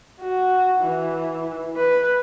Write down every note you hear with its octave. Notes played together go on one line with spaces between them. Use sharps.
F#4
E3
B4